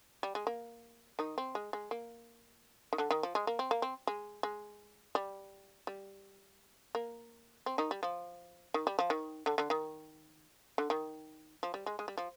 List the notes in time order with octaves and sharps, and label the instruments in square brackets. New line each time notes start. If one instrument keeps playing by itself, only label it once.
[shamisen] G3
G#3
A#3
D#3 D#4
C4
G#3
G#3
A#3
D#3
D3
D#3
F3
G#3
A#3
C4
A#3
C4
G#3
G#3
G3
G3
A#3
C4
D#3 D#4
G3
F3
D#3
G3
F3
D#3
D3
D3
D#3
D3
D#3
F3
G3
G#3
G#3
G3
F3